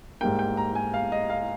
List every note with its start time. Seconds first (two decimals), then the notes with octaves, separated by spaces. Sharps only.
0.21 G#2 G3 A#3 G5
0.39 G5
0.57 A#5
0.75 G#5
0.94 F5
1.12 D#5
1.30 F5